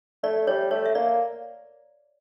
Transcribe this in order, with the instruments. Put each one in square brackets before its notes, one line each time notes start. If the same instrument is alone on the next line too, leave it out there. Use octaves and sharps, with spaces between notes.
[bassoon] A3 [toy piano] D5
[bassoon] G3 [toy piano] C#5
[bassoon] A3 [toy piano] C#5
[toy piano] E5
[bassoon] A#3 [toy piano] D5